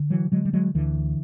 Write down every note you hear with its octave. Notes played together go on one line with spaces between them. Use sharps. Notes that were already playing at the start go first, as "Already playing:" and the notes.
Already playing: D3
E3 F#3
D3 F#3 G#3
G3
F#3 G#3
D2 D3 E3